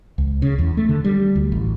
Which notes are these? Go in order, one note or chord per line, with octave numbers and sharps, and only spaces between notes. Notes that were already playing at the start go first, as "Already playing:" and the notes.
C#2
C#3
E2
A3
D3
G3
D2
A1